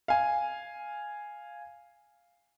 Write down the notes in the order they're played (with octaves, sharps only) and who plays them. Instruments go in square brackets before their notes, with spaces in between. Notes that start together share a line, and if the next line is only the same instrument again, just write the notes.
[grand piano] F5 G#5